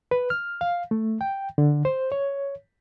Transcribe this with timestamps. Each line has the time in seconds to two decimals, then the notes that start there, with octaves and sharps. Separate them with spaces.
0.11 B4
0.30 F6
0.61 F5
0.91 A3
1.21 G5
1.58 D3
1.85 C5
2.12 C#5